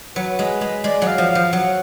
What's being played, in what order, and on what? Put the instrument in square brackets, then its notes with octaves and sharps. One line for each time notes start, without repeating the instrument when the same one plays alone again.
[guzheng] F#3 [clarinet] B4
[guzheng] G#3
G#3
[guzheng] G#3 [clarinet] D5
[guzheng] F#3
[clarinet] F5
[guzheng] F3
[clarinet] F5
[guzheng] F3
[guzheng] F#3 [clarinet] F#5